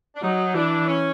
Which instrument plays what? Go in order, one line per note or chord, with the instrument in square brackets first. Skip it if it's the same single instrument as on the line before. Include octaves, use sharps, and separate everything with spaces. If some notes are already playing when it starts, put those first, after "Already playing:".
[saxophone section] D4
[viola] F#3 [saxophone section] D#4
[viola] E3 [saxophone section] D4
[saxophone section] C#4